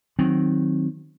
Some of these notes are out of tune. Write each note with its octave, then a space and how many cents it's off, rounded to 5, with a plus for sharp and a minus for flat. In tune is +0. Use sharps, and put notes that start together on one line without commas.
D#3 +0 F#3 +0 C4 +0